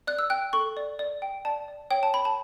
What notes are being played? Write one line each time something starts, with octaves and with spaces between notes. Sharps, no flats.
D5 F#6
E6
G5 F#6
A4 C#6
D5
D5
G5
D5 A5
D5
C#5 G5
A5
C#5 B5
A5